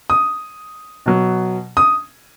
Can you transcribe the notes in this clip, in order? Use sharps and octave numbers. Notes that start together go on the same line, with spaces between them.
D#6
B2 F#3
D#6